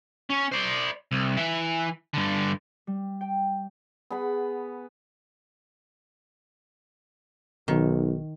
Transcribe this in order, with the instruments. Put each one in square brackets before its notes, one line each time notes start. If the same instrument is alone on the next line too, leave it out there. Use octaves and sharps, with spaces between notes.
[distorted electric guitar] C#4
C5 D5
C2
E3 E5
G2 D3
[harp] G3
G5
[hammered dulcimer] B3 G#4 F#5 B5
[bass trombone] B1 [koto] D#3